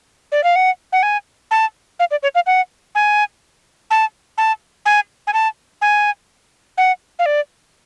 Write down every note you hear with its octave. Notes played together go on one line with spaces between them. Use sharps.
D5
F5
F#5
F#5
G#5
A5
F5
D5
C#5
F5
F#5
G#5
A5
A5
G#5
G#5
A5
G#5
F#5
F5
D5